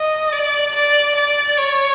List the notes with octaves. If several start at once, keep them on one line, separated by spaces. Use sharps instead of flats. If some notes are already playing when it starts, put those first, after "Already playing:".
Already playing: D#5
D5
D5
D5
C#5